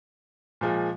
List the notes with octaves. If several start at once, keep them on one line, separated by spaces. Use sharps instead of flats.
A#2 F3 G#3